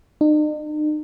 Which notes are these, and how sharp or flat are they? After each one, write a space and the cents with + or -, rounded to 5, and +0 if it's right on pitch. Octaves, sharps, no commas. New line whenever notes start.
D#4 -45